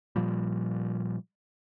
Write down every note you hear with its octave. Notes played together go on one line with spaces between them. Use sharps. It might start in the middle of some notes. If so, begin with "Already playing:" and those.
A#2 F3 G3